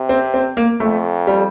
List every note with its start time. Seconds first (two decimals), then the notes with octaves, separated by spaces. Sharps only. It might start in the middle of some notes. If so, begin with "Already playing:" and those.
Already playing: C3
0.09 C4
0.34 C4
0.57 A#3
0.80 F2 A3
1.27 G3